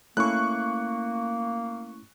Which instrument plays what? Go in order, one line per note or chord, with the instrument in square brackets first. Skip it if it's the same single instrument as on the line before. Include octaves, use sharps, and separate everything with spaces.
[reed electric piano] A3 C#4 E4 [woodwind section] A#3 [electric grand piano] C#6 F#6